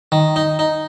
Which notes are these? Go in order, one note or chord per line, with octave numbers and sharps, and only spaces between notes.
D#3
D#4
D#4